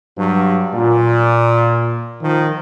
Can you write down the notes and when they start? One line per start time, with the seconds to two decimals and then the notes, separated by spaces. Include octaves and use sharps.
0.16 G2 F#3
0.74 A#2
2.21 D#3 F3